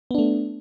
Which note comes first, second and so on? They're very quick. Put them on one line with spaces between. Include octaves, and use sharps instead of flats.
B3 D4 A3